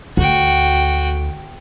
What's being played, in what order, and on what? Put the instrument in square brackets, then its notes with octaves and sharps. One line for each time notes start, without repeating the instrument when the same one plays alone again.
[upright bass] D2 [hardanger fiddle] F#4 G5